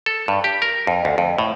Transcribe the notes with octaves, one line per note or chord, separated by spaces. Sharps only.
A4
G2
G4
A#4
F2
D2
F2
A2